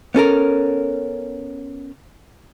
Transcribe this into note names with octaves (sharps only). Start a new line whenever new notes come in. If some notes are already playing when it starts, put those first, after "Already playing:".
B3 C#4 A4 A#4